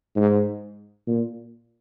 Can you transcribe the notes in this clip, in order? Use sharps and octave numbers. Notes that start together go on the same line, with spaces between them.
G#2
A#2